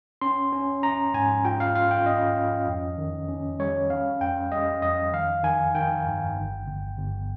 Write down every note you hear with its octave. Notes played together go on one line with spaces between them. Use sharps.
C#4 C6
C#4
C#4 A#5
G#2 G#5
F4 G5
F5
F4 F5
G5
C#4 D#5
C#4
F2
D#3
C#4
G3 C#5
C#4 F5
F2 G5
G3 D#5
F2 D#5
D#3 F5
D#3 G#5
D#3 G5
G2
G1
G1
G1